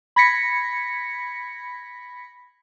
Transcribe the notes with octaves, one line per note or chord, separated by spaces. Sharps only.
B5 G#6 A#6 B6 C#7